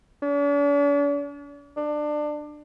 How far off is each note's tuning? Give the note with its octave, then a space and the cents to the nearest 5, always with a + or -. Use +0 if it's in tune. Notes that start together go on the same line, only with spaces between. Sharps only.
D4 -45
D4 +25